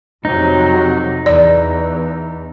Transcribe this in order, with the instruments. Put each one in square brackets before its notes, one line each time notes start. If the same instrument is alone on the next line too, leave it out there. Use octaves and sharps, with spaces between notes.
[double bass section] F2 C3 F#3 [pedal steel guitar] D#4
[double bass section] E2 [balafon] D5